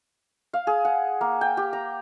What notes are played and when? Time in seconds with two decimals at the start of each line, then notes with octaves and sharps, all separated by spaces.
0.53 F5
0.67 G#4
0.85 F#5
1.21 A#3
1.41 G5
1.57 G4
1.73 A#5